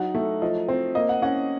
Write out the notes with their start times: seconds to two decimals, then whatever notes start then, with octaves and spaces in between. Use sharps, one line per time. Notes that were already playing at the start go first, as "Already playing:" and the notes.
Already playing: F#3 D#4 F#5
0.15 A3
0.42 F3 D#5
0.68 C4
0.95 A#3 D#5
1.09 F#5
1.22 C#4 F#5